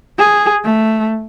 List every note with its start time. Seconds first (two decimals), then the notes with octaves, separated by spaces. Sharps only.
0.18 G#4
0.64 A3